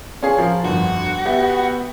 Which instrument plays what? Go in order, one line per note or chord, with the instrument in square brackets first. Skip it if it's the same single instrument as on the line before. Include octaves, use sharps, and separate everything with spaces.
[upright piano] C#4 F4 G#4
F3 A#4 F5
[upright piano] G1 F2 [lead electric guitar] F#4
[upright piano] B3 G4 E5